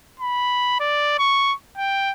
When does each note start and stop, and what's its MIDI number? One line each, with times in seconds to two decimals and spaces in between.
0.20 0.80 83
0.80 1.17 74
1.18 1.54 85
1.77 2.13 79